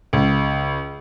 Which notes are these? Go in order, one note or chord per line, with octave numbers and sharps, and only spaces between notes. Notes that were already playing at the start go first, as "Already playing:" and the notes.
C#2